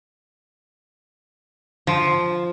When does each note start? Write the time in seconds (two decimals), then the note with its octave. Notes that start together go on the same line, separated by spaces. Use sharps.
1.87 F3